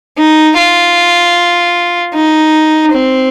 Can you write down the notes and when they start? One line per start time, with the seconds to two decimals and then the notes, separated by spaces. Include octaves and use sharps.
0.18 D#4
0.58 F4
2.14 D#4
2.93 C4